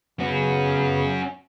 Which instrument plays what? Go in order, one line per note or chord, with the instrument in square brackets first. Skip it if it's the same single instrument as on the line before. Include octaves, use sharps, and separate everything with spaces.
[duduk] C#3 [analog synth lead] B3 [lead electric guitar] C#4 F#4